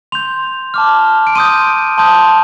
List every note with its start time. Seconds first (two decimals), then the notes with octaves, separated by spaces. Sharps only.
0.12 C6 G6 F7
0.74 A5 D6 F6
1.27 D7
1.35 C6 D#6 G6 D#7
1.98 A5 C6 D#6 G6